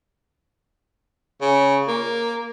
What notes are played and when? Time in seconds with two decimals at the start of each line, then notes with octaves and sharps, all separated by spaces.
1.41 C#3
1.88 A#3